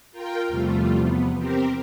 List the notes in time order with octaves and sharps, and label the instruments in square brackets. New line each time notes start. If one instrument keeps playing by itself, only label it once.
[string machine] F4 A#4 G5
[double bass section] E2 C3 F3 [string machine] G3 A3 F4
[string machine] B3
C4 G4 A#4